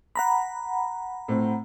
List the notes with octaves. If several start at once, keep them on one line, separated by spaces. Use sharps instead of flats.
F#5 A#5 B5
A2 C4